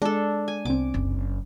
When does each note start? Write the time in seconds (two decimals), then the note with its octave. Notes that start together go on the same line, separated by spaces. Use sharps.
0.02 G#3 D4 A4
0.48 G#5
0.65 C2 B3 C4 D6
0.94 F#1